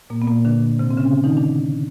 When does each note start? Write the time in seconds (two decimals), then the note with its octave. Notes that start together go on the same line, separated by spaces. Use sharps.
0.10 A#2 A#3
0.22 B3
0.27 A#2 A#3
0.45 D3 D4
0.79 C3 C4
0.91 C4
0.97 C#3 C#4
1.24 D#3 D#4
1.37 D3 D4